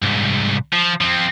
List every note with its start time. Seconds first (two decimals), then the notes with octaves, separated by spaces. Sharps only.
0.02 C2 G#2
0.73 F3
1.01 F3 C4